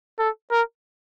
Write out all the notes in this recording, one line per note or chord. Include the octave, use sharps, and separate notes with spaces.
A4
A#4